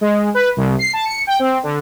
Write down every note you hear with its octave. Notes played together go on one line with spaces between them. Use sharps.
G#3
B4
C2
C7
A5
C#7
G5
C4
D3